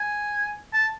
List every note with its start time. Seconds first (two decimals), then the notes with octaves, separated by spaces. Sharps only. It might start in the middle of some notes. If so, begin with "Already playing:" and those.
Already playing: G#5
0.73 A5